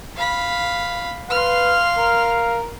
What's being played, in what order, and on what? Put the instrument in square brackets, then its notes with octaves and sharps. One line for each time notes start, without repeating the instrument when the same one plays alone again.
[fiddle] F5 B5
[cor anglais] B4 [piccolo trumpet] F5 [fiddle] C6 F6
[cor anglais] A#4